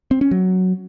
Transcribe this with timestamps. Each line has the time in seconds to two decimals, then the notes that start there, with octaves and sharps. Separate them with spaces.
0.11 C4
0.21 C#4
0.31 F#3